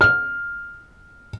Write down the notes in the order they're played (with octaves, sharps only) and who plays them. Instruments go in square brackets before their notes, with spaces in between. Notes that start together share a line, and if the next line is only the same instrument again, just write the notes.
[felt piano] F6